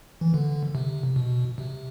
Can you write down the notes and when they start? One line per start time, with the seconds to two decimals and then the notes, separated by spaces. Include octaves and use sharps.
0.21 E3
0.34 D3
0.75 C3
1.16 B2
1.58 C3